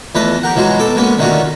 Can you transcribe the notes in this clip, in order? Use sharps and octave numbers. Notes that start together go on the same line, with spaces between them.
E2 A3 F4 B4 D#5
G4 A#4 F#5
E3 F#3 G#3 F4 F#4
B2 A4 D6
G#3 A#3 B3 C#4
D3 D#3 A3 C#4 F4 F#4